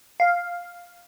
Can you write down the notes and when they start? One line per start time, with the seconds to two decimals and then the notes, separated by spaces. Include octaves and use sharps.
0.20 F5